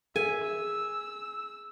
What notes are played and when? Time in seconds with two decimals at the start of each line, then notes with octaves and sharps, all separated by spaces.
0.16 G#4 E5 G#5
0.44 E6